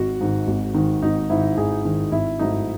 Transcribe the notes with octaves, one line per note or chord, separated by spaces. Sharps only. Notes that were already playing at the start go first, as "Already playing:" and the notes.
Already playing: G#1 F#4
G#2 D#3
G#1
G#2 D#3
G#1 D#4
G#2 D#3 E4
G#1 G#4
G#2 D#3
G#1 E4
G#2 F#3 A3 D#4